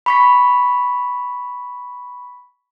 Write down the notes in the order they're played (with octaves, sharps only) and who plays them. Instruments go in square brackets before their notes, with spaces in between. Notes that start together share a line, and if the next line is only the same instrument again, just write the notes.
[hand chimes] B5 C#6 B6